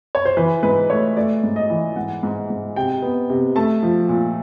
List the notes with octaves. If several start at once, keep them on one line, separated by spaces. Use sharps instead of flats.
C#5
C5
E3 B4
G#2 B4
A3 C#5
A3 D5
G#2
D#5
E3
G#2 F#5
G#2
G#2
C3 G5
B3
C3
A3 A5
F3
A#2